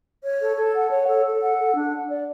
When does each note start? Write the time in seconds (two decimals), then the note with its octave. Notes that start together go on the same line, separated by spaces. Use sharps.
0.24 C#5
0.41 A4
0.57 A4
0.75 F#5
0.91 C#5
1.07 A4
1.25 A4
1.41 F#5
1.58 A4
1.75 D4
1.92 F#5
2.08 D5